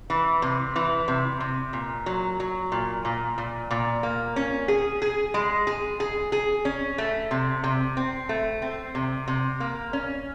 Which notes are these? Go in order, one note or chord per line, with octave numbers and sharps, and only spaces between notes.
E3
C3
E3
C3
C3
A#2
F#3
F#3
A#2
A#2
A#2
A#2
A#3
C#4
G#4
G#4
G#3
G#4
G#4
G#4
C#4
A3
C3
C3
C4
A3
C4
C3
C3
A#3
C#4